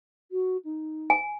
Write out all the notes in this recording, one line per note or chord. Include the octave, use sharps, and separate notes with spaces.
F#4
D#4
G#5